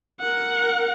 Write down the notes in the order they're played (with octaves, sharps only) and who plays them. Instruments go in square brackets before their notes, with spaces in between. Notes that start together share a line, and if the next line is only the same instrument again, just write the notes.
[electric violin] A#4 F#5